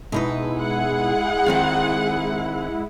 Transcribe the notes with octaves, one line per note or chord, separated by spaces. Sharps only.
B2 G#3 D#4 E4 B4
G#4 F#5
D#3 C4 F4